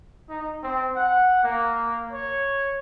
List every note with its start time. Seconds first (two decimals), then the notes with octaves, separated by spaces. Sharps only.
0.29 D#4
0.63 C4
0.96 F#5
1.43 A#3
2.12 C#5